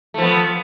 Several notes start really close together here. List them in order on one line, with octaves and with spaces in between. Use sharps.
A3 F3 B3